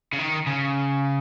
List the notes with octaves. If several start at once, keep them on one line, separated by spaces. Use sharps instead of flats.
C#3
D#3
C#3